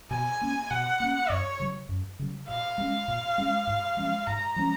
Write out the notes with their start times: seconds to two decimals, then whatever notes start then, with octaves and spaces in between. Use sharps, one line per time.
0.11 B2 G#5
0.41 A#3 C#4
0.71 B2 F#5
1.00 A#3 C#4
1.29 F#2 C#5
1.60 C#3 F#3
1.89 F#2
2.19 C#3 F#3
2.48 A#2 F5
2.78 G#3 C#4
3.08 A#2
3.38 G#3 C#4
3.67 G#2
3.97 F3 G#3 C#4
4.26 G#2 A#5
4.56 F3 G#3 C#4